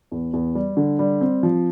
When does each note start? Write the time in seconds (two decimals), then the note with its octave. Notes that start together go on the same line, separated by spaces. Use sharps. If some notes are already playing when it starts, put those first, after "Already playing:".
0.12 E2
0.33 E2
0.55 G3
0.77 D3
0.99 G3
1.21 C4
1.43 F3